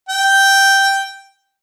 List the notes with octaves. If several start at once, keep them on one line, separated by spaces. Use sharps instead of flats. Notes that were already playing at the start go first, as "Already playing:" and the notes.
G5